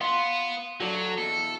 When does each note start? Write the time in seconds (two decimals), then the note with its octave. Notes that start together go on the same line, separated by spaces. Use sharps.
0.01 B3 F5 C6
0.80 F#3 F#4 A4 D5
1.18 E2 B2 A4